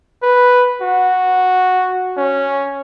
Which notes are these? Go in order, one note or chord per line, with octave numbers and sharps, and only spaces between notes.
B4
F#4
C#4